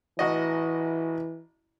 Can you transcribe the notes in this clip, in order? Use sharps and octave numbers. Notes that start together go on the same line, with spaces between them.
A1 E3 F#4 D#5